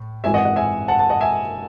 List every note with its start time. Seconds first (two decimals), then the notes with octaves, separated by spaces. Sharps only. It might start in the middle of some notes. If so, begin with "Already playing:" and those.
Already playing: A2
0.24 G#1 F#2 E3 G#3 E5 G#5
0.34 D#5 F#5
0.45 D#5 F#5
0.56 E5 G#5
0.88 F#5 A5
0.99 F#5 A5
1.10 D#5 F#5
1.21 E5 G#5